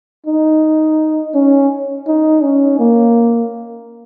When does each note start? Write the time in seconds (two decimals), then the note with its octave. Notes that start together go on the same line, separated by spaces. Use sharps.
0.26 D#4
1.34 C#4
2.07 D#4
2.43 C#4
2.79 A#3